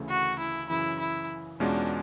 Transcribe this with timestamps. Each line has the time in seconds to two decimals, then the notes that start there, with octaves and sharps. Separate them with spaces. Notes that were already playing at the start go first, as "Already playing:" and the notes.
Already playing: D2 C#3 E3 A3
0.10 F#4
0.39 E4
0.70 F#2 C#3 E3 E4
1.00 E4
1.60 E2 B2 G#3 C#4 D4 F4